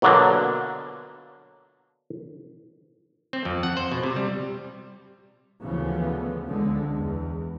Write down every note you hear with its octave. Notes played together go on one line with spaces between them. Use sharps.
B2 D3 F#3 A#3 D4 F#4
C4
F2
F#5
C5
B2
C3
G3
D2 C#3 E3 F3 B3
C#2 D3 G#3
E2